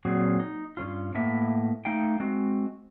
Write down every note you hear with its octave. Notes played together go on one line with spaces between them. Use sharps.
A#2 F#3 C4 F#4 G#4
D#4
G2 D#3 C#4 F4
A2 A#3 B3 E5
A3 D#4 F5 G5
G#3 C4 F#4